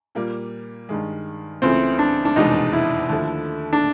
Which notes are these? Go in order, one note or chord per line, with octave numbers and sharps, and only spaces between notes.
A#2 G3 A#3
G2 D#3 G#3
C#2 C#3 E3 A3 C4
D4
D4
F1 E2 B2 G#3 D#4
E4
D#2 D3 F3 A3
D4